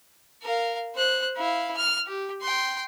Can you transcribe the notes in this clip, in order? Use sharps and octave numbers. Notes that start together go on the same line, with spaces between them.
A#4 F5
C5 F#6
E4 F5
F6
G4
G5 C6